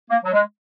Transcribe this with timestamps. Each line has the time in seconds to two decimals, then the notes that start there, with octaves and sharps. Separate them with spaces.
0.10 A#3
0.24 F#3
0.33 G#3